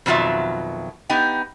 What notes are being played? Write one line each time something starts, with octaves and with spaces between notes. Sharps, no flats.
F2 B2 D#3 F#3 F4 E5
B3 D#4 G4 G5